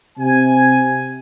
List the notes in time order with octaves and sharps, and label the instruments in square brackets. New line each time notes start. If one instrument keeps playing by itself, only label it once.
[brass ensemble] C3 G#5